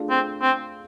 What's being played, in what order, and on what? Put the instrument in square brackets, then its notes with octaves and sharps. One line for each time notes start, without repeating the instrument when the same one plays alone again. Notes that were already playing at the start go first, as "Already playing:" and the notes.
Already playing: [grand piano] A3 D4 F4 G#4
[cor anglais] C4
C4